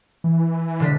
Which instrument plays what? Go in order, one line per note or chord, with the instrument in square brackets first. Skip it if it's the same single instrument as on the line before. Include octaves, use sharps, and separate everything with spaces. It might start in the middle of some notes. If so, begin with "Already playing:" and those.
[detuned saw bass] E3
[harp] E1 D3 B6